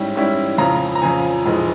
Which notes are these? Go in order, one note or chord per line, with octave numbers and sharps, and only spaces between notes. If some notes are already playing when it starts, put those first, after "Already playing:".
Already playing: G#2 G3 C#4 E4
G#2 G3 C#4 E4
F2 C#3 F3 A#5
A#5
F2 C#3 F3 G#5
F1 F2 E3 G#3